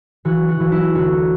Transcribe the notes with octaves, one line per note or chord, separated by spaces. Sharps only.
E3 F#4
F#4
E3
E4
D2 F#4